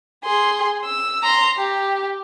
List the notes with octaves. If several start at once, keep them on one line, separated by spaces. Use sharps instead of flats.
G#4 C6
E6
A#5 C6
G4